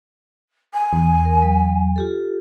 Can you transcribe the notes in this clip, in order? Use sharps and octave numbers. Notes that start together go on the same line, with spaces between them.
G#5
E2
A#4
F#3
F4 G4 A4